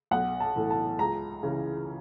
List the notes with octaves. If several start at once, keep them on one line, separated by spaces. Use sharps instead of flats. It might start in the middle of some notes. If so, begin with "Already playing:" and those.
B1 F#5
A5
A2 E3 A3
A5
C#2 A#5
C#3 E3